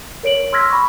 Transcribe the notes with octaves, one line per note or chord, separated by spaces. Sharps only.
A#4 C#5 D7 F#7
C6 E6 F6 G#6 A#6 B6
B5 C#6